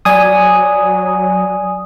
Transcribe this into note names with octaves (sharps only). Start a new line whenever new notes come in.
F#3 D5 G#5 D#6